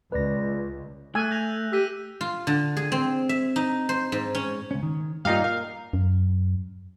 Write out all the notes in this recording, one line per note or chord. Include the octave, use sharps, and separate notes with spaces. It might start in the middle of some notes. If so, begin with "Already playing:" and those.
C#2 B4 D5 A#6
A3 G#5 E6 F#6
G6 A#6 F7
G4 E6 B6 D#7
F4
D3
G#4
C4
E5
D#4
C5
G#2
C#4
C#2 C#4
D#3
G2 A#2 D#4 G4 F5
A#4 F5
F#2